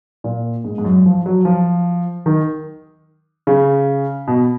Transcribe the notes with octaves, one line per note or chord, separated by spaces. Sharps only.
A#2
G#2
G#2
F#2
F3
F#3
F3
D#3
C#3
B2